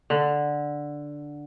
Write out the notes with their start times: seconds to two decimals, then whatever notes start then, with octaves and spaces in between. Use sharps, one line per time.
0.10 D3